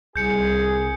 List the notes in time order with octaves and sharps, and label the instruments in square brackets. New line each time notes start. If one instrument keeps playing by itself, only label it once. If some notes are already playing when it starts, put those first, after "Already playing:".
[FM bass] C2 [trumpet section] G#4 [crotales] G6 C#7